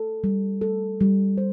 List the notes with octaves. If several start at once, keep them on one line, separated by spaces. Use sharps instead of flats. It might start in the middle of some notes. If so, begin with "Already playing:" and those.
Already playing: A4
G3
A4
G3
C5